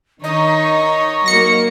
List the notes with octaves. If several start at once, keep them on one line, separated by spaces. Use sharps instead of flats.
D#3 D#4 C#5 D#5 C#6
F#3 A#3 A#6 C#7